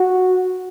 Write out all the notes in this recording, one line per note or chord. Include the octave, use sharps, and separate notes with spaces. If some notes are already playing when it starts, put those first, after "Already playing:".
Already playing: F#4